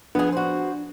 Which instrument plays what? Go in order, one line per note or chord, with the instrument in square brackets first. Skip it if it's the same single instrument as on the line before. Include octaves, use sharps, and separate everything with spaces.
[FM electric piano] F3 D4 [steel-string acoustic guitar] B3 G#4
[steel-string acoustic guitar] F#4 C5